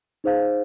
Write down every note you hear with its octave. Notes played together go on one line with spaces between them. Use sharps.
D#4 G#4 C5 F5